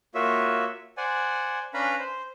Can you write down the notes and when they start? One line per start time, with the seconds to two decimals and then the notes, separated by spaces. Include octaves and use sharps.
0.15 A#3 F4 F#4 C#5 E5
0.97 C5 D5 F#5 G#5
1.74 C#4 D4 B4 F5 A#5 B5
1.99 C5